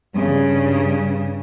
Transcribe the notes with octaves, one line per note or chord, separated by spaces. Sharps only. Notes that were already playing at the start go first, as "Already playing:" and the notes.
G2 C#3